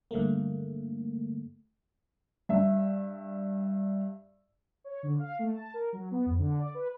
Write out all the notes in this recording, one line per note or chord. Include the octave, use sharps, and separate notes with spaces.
G2 D3 A3 A#3
G2 E5
C#5
D3
F5
A3
A5
A#4
F#3
B3
F2
D3
D5
B4